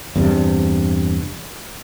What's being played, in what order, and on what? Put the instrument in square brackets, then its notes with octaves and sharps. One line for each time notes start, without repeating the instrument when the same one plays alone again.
[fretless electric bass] E2 G2 C3